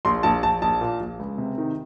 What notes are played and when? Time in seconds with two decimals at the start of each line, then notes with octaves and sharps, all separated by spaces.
0.05 A#1 C6
0.23 A#1 A5
0.43 A#1 A5
0.62 A#1 A5
0.81 A#2
1.00 A#1
1.19 C#2
1.38 C3
1.58 D#3